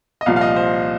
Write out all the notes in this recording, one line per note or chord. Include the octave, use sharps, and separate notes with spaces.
D#5
C2 A#2 F3 F5
F5
D#5
C5